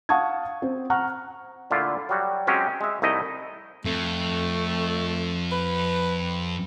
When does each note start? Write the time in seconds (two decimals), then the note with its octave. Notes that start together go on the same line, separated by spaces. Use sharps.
0.09 F5 F#5 A5 C#6 D#6 G#6
0.62 C4
0.90 F#5 A#5 C#6 F6 F#6
1.70 A#2 D3 A3 E4 F4
2.09 F#3 G3 F#4
2.47 F#3 G#3 C4 C#4 G4
2.81 G#3 E5
3.02 C2 A3 D#4 E4 D#5
3.85 F2 A3
5.52 B4